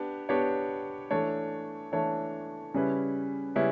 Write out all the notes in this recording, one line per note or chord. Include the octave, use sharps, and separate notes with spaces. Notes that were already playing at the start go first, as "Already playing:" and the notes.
Already playing: B3 D4 G4
B3 D4 G4 C#5
E3 A3 D4 A4 C#5
E3 A3 D4 A4 C#5
C#3 G3 C#4 E4 B4
C#3 G3 C#4 E4 B4